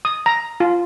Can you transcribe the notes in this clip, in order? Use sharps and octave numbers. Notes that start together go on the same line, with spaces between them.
D#6
A#5
F4